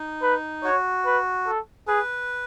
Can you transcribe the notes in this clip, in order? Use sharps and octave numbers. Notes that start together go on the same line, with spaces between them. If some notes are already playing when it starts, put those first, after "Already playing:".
Already playing: D#4
B4
F#4 C#5
B4
A4
G#4 B4